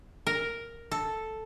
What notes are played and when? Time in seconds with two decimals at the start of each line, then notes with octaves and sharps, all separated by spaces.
0.27 A#4
0.91 A4